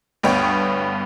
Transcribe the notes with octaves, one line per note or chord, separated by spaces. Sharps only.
D2 G2 B3 C#5 G5